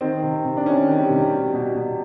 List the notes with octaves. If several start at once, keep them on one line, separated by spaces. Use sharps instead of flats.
D#3 C4
C3
C3
D4
D#3 C#4
D#3
G3
C3
B2
B2
B2